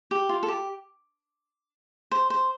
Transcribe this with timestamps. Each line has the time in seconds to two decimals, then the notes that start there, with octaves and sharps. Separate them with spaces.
0.11 G4
0.29 F4
0.43 A4
0.48 G4
2.11 C5
2.30 C5